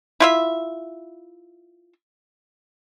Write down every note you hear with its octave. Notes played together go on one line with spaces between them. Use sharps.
E4 F4 E5